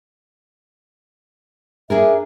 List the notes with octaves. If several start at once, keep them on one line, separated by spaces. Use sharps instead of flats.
D4 G#4 A#4 E5